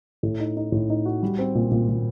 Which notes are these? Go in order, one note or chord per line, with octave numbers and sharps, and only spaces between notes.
A2
D#4
D#4
A2
D#4
F#4
G3
C4
A#2
A#2
A#2